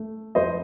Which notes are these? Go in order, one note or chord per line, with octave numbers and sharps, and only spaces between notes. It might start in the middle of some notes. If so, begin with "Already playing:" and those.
Already playing: A3
F2 C5 D#5